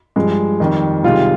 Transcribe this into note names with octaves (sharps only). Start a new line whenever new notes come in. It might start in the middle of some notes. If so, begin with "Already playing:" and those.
G2 F3 G#3
F2 D#3 G3
C2 C3 D#3 G#3 F4